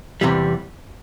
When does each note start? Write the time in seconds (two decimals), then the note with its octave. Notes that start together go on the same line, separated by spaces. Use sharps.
0.21 E2 C3 E3 G3